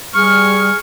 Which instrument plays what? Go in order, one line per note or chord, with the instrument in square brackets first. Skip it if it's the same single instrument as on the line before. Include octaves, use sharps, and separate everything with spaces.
[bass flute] G3 [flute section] G#4 F6 [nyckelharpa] C#6